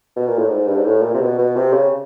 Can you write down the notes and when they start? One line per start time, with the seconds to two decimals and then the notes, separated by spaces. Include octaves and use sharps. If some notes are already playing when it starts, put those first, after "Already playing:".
0.17 B2
0.28 A#2
0.38 A2
0.49 G#2
0.68 G2
0.77 G#2
0.85 A2
1.03 A#2
1.14 C3
1.20 B2
1.39 B2
1.56 C3
1.73 C#3